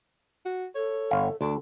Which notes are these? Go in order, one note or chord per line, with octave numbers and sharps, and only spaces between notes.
F#4
A4 C#5
G1 F5
D2 D4 A4